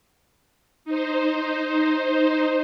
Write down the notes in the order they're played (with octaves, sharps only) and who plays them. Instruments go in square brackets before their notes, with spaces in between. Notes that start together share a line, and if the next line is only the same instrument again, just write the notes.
[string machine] D#4 C5